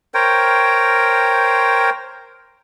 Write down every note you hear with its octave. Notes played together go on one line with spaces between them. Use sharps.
A#4 C5 C#5 G5